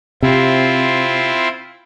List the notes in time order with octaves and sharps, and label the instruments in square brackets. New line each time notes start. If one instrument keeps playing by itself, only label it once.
[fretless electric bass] C3 [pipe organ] C4 E4 F4